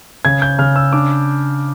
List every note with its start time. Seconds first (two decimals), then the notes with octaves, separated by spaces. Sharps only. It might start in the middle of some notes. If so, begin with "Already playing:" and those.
0.25 C#3 G#6
0.42 G6
0.59 C#3 F6
0.76 E6
0.93 D4 D6